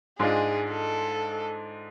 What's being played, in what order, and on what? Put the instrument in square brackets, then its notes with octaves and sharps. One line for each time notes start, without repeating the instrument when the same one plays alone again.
[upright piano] G#2 G#3 D4 F4 [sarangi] G#4
[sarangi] A4